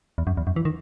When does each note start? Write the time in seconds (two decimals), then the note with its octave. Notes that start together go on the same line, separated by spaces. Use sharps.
0.18 E2
0.27 F#2
0.37 E2
0.47 F#2
0.56 E3
0.65 D#3